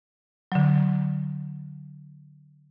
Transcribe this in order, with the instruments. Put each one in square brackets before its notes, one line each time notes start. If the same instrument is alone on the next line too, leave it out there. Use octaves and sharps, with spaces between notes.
[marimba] D3 F#3